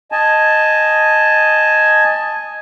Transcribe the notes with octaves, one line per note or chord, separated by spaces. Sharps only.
D#5 G#5 A5